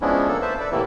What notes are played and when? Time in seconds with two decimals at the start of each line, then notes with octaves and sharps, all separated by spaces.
0.01 F3 G#3 B3 C#4 D4 E4
0.28 A#3 A4
0.42 B4 C5 E5 A5
0.60 A4 B4 D5
0.72 A2 C3 E3 A#3 E4